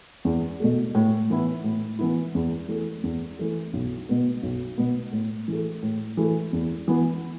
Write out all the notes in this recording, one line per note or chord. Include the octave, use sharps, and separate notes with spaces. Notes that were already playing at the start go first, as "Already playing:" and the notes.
E2
B2 A3
A2
E3 B3 E4
A2
E3 B3 E4
E2
E3 A3
E2
E3 A3
B1
B2 B3
B1
B2 B3
A2
E3 A3
A2
E3 A3
E2
E3 B3